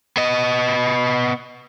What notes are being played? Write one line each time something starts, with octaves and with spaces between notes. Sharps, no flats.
B3 D#5